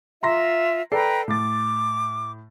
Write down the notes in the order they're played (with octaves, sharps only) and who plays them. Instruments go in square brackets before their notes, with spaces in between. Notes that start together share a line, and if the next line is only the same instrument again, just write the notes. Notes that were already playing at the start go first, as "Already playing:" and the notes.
[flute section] F4 E5 [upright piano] A#5 C6 A#6
[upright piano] A4 D5 C7 [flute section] B4 G5 A#5
[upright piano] A2 A6 [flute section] D6